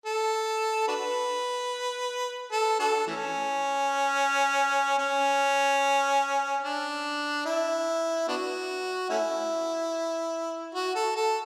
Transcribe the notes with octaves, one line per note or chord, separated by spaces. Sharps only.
A4
D4 F#4 B4
A4
D4 F#4 A4
E3 A3 C#4
C#4
D4
E4
B3 D4 F#4
A3 C#4 E4
F#4
A4
A4